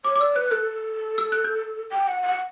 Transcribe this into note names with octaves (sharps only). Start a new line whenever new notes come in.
C#5 D6
D6
D5 E6
B4 F#6
A4 F#6
E6
F#6
G6
G5
F#5
F#5